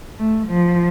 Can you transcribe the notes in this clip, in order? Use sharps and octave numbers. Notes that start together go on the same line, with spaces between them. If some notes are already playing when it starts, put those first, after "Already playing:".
A3
F3